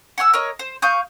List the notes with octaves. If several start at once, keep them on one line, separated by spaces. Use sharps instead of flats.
F#5 G#5 C#6 E6
A#4 C#5 D#5
C5
F5 C#6 D#6 G6